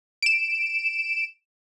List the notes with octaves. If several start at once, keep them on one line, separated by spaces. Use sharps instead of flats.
D7 E7